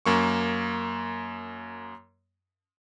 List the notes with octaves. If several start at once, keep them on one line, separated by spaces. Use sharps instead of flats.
F#2 A#3 C#6